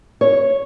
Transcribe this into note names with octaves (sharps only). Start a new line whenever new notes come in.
C#5